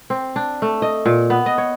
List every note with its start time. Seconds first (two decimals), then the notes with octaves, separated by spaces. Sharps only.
0.10 C4
0.36 D4
0.62 A3
0.82 D#5
1.06 A#2
1.30 B3
1.46 D#5
1.58 C#5